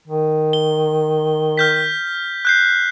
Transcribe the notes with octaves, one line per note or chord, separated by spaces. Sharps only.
D#3
G7
F6 G6 B6
F#6 G6 C7